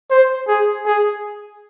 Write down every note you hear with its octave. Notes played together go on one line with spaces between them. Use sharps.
C5
G#4
G#4